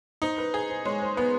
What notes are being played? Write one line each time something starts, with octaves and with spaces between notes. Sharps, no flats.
D#4 C5
B4
G#4 C5
C5
G#3 C#5
C5
B3 B4